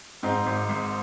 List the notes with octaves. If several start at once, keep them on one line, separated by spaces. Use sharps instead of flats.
G#2 C4 D#4
G#1
G#1